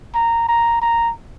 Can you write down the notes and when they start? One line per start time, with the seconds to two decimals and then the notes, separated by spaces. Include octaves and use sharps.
0.15 A#5
0.48 A#5
0.82 A#5